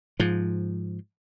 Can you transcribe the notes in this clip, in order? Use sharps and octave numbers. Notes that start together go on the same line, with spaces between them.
G#2 F3